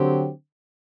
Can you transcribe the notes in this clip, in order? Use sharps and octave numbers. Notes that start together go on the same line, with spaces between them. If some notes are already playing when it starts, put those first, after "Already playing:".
Already playing: D3 F#3 C4 G4